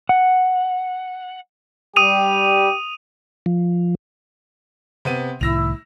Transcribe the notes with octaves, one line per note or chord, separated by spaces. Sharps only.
F#5
G3 G4 D#6 D#7 F7
F3
C3 B3 D#7
C2 A2 D#3 E4 E6 A#6 F7